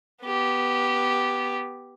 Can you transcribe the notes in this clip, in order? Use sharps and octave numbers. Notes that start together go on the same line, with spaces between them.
B3 G4